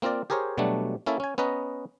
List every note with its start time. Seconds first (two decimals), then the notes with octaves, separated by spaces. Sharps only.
0.02 A#3 C4 F4 A#4 D5
0.30 G4 G#4 A#4 C5 C#5
0.58 B2 F#3 G3 A3 D4
1.06 A#3 C#4 E4 A4 E5
1.20 C#4 G#5
1.38 B3 C#4 B4 D#5 A#5